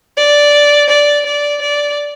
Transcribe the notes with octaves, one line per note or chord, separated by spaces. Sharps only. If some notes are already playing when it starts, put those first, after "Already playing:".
D5
D5
D5
D5